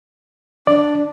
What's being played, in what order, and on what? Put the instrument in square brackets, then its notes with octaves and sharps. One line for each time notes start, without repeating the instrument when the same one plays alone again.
[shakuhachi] D4 [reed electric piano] D5